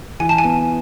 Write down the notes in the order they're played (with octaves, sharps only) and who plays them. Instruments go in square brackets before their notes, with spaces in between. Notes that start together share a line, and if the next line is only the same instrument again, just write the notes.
[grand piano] E3 [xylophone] G#5
[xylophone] A5
G#5
[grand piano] B3